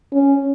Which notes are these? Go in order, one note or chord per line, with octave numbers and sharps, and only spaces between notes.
C#4